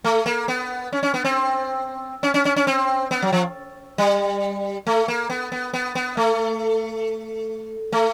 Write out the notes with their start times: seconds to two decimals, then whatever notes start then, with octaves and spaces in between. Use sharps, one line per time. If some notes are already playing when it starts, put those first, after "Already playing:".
0.04 A3
0.26 A#3
0.48 B3
0.93 C#4
1.03 C#4
1.14 B3
1.24 C4
2.23 C#4
2.34 C#4
2.45 C#4
2.56 C#4
2.67 C4
3.11 B3
3.22 F#3
3.32 F3
3.98 G3
4.87 A3
5.08 A#3
5.30 B3
5.52 B3
5.74 B3
5.95 B3
6.17 A3
7.92 A3